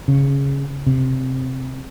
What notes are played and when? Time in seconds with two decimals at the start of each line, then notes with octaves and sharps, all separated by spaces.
0.08 C#3
0.87 C3